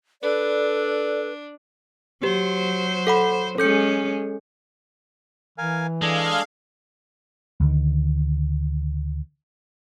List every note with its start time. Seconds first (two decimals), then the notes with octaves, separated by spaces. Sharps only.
0.22 D4 A4 B4 D5
2.23 F#3 G4 C5
3.07 A4 F#5 B5
3.58 G#3 C#4 A4 G6 C#7
5.58 E3 A#4 F5 G#5
6.02 G#3 D4 G#4 A4 F5
7.60 D2 D3 D#3